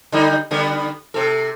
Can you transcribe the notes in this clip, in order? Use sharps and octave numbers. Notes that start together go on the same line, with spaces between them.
D3 G3 D#4
D3 G3 B3
C3 A4